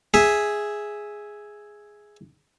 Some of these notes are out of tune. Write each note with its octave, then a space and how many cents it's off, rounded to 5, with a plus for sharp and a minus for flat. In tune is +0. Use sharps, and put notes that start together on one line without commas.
G#4 +0 E5 +0